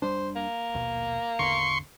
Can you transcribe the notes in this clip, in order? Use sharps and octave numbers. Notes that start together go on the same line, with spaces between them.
F1 G3 D4 C5
A#3
A#1 D#2 B2
G#1 E2 D3 C6 C#6